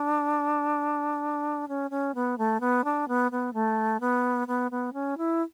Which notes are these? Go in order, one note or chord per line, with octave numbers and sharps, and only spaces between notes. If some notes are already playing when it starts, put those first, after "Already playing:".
Already playing: D4
C#4
C#4
B3
A3
B3
D4
B3
B3
A3
B3
B3
B3
C#4
E4